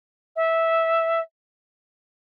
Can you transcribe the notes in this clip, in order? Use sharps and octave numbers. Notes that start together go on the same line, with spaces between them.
E5